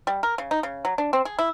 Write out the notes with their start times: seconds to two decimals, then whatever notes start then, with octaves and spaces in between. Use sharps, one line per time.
0.07 G3
0.23 A#4
0.38 C#3
0.51 D#4
0.63 C#3
0.85 F#3
0.98 D4
1.13 C4
1.25 G#4
1.39 E4